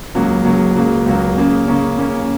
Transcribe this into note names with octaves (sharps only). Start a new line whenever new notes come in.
C#2 C#3 F#3 A#3
C#2 C#3 F#3 A#3
C#2 C#3 F#3 A#3
C#2 C#3 F#3 A#3
C#3 A#3 C#4
C#3 A#3 C#4
C#3 A#3 C#4